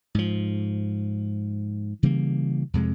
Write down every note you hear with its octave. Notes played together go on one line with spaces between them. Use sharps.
G#2 F3
C#3 E3 G3 A#3
F2 C3 G#3